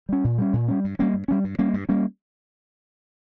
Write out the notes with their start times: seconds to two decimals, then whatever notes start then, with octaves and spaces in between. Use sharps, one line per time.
0.09 G3 C#4
0.24 A#2
0.38 G3 C#4
0.53 A#2
0.68 G3 C#4
0.84 G2
0.99 G3 A#3 C#4
1.14 G2
1.28 G3 A#3 C#4
1.44 G2
1.59 G3 A#3 C#4
1.74 G2
1.89 G3 A#3 C#4